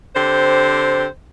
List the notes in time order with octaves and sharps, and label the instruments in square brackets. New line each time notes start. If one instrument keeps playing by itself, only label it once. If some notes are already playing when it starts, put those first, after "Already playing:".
[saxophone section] D3 C4 G4 C5